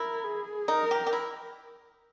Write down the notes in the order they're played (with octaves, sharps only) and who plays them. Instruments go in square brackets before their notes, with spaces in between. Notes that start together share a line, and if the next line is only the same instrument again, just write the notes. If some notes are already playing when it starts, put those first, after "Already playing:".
Already playing: [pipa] E4 [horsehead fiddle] A#4
[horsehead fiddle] G#4
[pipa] D#4 [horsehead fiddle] A#4
[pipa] G4
G4
E4